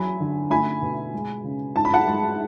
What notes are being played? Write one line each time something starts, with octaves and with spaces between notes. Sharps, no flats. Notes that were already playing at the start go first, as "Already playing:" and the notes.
Already playing: E3 F#3 G#5 B5
D3
A3 G#5 B5
B2
G#3
C#3
G#2 A5
B5
F#5 A5
G#3